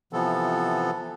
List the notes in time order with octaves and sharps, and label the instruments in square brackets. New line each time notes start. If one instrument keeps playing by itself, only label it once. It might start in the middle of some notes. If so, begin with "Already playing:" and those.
[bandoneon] C3 E3 F3 B3 A4